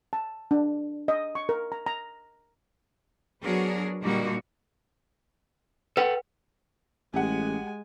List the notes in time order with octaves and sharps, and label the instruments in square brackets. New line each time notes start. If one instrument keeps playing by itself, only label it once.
[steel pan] A5
D4
D#5
C#6
A#4
A#5
A#5
[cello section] F#3 B3 D4 F#4 G#4 A#4
A#2 D3 G3 A#3 D#4 F#4
[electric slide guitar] A4 F#5 G5 [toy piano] B4
[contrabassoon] A1 [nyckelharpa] G#3 G#5 [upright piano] G4 G#4 F#5